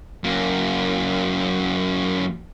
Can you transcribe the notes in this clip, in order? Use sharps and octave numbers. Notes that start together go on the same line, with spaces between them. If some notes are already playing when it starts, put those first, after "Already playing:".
F#2 A#3